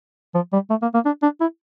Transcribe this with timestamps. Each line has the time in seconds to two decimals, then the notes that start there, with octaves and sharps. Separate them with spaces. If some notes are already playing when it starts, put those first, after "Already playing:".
0.34 F3
0.53 G3
0.70 A3
0.82 A#3
0.94 A#3
1.05 D4
1.23 D4
1.41 E4